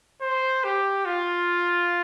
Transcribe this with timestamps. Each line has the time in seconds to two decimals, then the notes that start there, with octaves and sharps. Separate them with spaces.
0.22 C5
0.64 G4
1.06 F4